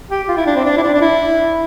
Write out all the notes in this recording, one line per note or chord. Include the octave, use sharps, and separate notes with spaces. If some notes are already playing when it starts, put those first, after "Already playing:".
G4
F4
E4
D4
C4
D4
E4
D4
D4
E4